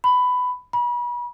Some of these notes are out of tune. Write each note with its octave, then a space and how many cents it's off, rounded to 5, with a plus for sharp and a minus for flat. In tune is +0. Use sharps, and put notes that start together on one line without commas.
B5 +15
B5 -35